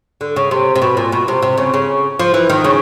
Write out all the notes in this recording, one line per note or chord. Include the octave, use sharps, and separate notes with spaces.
D3
C#3
C3
C3
B2
A#2
B2
C3
C3
C#3
C#3
F3
E3
D#3
C#3